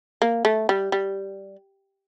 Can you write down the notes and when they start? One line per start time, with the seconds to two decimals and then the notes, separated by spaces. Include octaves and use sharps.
0.22 A#3
0.45 A3
0.69 G3
0.92 G3